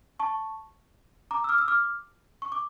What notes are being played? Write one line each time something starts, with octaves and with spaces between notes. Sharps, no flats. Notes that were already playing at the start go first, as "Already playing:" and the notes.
A5 C#6
A#5 D6
E6
D6 F6
E6
D6 F6
C#6
D6